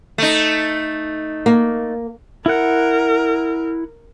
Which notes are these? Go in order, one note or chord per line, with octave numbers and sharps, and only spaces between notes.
A3 D#4
A#3
E4 A#4 F#5